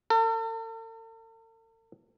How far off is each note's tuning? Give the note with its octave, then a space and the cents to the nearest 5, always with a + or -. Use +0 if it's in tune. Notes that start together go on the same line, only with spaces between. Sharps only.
A4 +45